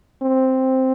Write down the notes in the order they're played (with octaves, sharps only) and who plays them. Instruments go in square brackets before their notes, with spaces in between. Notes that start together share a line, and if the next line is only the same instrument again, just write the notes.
[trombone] C4